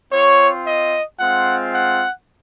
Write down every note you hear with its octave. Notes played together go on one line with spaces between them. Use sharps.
C4 F4 C#5
D#5
G#3 C4 F4 F#5
F#5